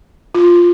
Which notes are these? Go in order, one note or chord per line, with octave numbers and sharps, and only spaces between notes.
F4